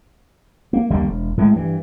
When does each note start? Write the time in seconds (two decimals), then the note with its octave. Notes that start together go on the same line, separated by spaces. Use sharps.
0.73 A#3
0.90 D#2 D3 G3 A#3
1.05 E1
1.37 A2 G#3 A3
1.53 G2 E3